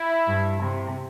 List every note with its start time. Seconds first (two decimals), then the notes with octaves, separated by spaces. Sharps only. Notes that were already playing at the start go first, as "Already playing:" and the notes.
Already playing: E4
0.27 G2
0.63 C3